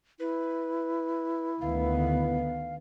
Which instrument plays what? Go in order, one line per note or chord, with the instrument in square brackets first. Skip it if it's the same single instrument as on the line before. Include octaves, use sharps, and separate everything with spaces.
[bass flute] E4 [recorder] B4
[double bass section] D2 D#3 B3 [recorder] F5